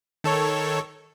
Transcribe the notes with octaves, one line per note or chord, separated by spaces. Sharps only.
D#3 A4 C#5